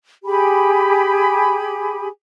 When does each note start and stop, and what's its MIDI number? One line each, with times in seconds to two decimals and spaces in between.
0.24 2.06 67
0.24 2.06 68
0.24 2.06 80
0.24 2.06 83